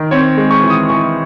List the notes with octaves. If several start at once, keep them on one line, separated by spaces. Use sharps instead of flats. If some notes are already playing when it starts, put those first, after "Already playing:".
Already playing: D#3
C4 C#5
G#3
C#6
E3
D#6
E3 C#6